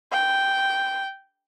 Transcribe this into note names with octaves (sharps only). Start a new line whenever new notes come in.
G5